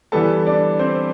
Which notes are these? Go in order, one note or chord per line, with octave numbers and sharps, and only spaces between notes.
E3 G3 B3 A4 A5
D4 D5
C4 C5